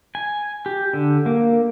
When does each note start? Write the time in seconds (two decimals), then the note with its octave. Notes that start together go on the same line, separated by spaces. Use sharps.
0.15 G#5
0.66 G4
0.93 D3
1.26 A#3